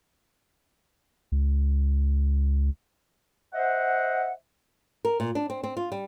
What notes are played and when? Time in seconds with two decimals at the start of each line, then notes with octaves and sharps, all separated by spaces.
1.32 C#2
3.54 C5 D#5 E5 F#5
5.05 A#4
5.20 A#2
5.35 D4
5.50 C4
5.63 C4
5.77 F4
5.92 G3